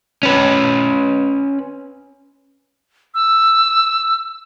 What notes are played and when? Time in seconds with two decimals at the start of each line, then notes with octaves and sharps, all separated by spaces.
0.23 C#4 B4
3.15 E6